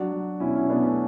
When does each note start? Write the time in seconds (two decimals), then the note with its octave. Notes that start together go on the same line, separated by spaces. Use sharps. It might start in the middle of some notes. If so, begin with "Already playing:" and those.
Already playing: F#3 D4 F#4
0.12 F#3
0.40 B2 C#4 E4
0.56 C#4 E4
0.70 B2 B3 D4
0.83 A3 C#4